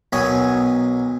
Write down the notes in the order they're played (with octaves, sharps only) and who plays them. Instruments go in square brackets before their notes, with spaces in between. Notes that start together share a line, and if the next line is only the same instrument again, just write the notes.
[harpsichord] B1 B3 A#4 C#5 G#5 D#6